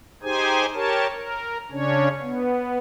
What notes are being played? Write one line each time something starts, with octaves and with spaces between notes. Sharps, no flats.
D#4 G4 G#4 C5 G#5
G4 A#4 C#5 A5
A#4
C#3 C#4 D4 C#5
B3